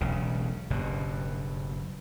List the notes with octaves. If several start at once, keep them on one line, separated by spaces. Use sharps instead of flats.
E1 B1 C#3
F#1 G2 B2